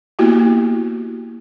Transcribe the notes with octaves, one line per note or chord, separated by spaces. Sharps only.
A#3 B3 E4 F#4 G4